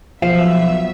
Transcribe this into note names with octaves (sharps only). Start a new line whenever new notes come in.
B1 B2 F3 E5 F5